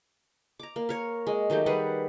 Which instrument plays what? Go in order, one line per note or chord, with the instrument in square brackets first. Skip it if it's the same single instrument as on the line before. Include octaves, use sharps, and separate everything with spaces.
[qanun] A#5 D6
A#3
A#4 C#5
G#3
D#3 F#3 A3 G4
G3 G#4 B4 F#5